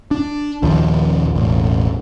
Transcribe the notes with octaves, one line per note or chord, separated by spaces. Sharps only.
D4
A#1 D#2 F3
E1 A1